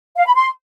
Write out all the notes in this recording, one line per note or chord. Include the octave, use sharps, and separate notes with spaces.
F5
B5
C6